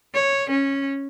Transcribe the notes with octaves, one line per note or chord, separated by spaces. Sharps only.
C#5
C#4